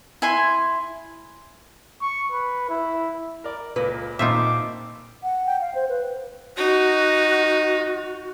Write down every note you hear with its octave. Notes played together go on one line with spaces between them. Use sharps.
E4 G#5 C6
C#6
B4
E4
A#4 D5
C#2 A#2 B4
G#1 A#2 C4 D#4 F4 E5 D6
F#5
G5
F5
C5
B4
D#4 F#4